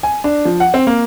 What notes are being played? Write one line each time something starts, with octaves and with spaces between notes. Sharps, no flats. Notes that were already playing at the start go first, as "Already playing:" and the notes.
G#5
D4
F3
F#5
C4
A#3